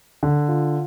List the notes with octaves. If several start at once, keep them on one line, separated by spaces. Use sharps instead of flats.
D3
F4